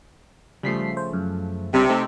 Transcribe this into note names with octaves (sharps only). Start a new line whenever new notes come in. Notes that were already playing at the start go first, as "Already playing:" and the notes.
C#3 F3 G3 A3 B6 C7
C5
F#2
C#2 C3 G3 D4
A3 C4 D#4 A4